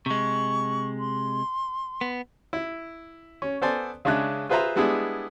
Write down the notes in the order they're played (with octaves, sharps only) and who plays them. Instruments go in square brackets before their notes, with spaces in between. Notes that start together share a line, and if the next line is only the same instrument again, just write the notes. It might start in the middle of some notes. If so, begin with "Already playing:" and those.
[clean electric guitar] C3 G#3 [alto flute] C#6
[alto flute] C6
[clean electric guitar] B3
[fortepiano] E4
C#4
B3 A4 C5 D5 G#5
C#3 G#3 C#4 D4 E5 F#6
F4 G#4 B4 C5 E5 A#5
G3 G#3 B3 D4 E4 G#4